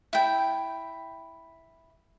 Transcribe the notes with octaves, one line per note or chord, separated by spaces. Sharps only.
E4 G5